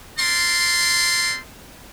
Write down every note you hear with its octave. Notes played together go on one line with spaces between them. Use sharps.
C4 A#4 D5 C6